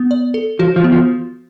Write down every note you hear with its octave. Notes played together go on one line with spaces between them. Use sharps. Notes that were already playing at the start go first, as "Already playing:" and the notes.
Already playing: B3
D5
A4
F3 F#4
F3
B3
F3